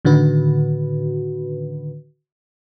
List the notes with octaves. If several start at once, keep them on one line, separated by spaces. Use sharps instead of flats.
A2 D3 D#3 F#4 B4